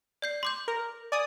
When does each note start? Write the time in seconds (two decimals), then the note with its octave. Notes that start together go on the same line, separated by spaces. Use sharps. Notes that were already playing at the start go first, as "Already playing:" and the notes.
0.22 D5 G6 C7
0.43 C6 D6 G6
0.68 A#4
1.12 D5 G#5 D#6